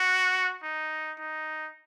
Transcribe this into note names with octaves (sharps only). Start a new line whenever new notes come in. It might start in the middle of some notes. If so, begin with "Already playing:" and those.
Already playing: F#4
D#4
D#4